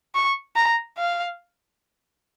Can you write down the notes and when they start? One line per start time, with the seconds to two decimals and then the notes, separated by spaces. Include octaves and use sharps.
0.15 C#6
0.56 A#5
0.98 F5